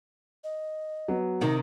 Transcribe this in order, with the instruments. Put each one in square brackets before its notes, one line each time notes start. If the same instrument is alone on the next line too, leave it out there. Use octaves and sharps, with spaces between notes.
[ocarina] D#5
[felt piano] F#3 B3
[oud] C3 D#3 [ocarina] D#4